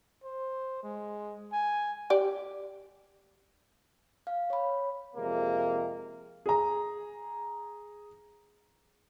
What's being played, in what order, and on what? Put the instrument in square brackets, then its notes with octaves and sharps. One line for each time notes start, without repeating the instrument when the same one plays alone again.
[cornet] C5
G#3
G#5
[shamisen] G4 D5
[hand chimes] F5
C#5 B5
[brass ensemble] F2 C3 G#3 A#3
[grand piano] G#4 A#5